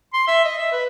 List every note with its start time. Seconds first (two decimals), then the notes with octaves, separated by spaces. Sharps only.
0.13 C6
0.28 E5
0.45 D#5
0.58 E5
0.72 B4